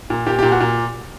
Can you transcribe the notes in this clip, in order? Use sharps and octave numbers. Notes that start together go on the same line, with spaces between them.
A#2
A#2 G4
G4
A#2
F#4
A#2